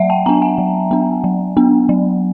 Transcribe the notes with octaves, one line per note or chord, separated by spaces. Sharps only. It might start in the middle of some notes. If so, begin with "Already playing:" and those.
Already playing: F#3 E5 F#5
G5 A5
B3 D4 G#5 A#5
F#5 G#5
F#3
B3 D4
F#3
B3 D4
F#3